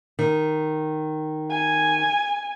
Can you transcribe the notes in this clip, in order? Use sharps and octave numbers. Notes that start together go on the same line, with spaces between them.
D#3
G#5